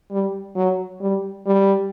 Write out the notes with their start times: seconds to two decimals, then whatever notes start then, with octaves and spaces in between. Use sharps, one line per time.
0.11 G3
0.56 F#3
1.01 G3
1.46 G3